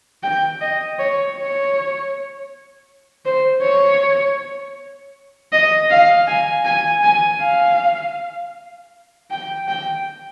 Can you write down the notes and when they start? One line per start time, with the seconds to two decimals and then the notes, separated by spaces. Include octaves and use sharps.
0.23 G5
0.61 D#5
0.99 C#5
1.37 C#5
3.25 C5
3.63 C#5
5.53 D#5
5.90 F5
6.27 G#5
6.65 G#5
7.03 G#5
7.41 F5
9.31 G5
9.68 G5